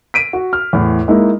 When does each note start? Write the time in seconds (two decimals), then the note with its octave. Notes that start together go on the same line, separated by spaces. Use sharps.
0.14 B6 D7 D#7
0.33 F#4
0.53 F6
0.73 E2 A2
1.08 G#3 A#3 D#4 E4